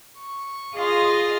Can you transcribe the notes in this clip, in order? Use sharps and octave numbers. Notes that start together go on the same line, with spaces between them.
C#6
F4 G#4 D#5 F5 C6